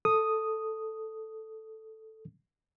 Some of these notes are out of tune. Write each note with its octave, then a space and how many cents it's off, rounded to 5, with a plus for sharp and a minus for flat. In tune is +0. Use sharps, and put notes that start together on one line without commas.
A4 +0 D#6 +0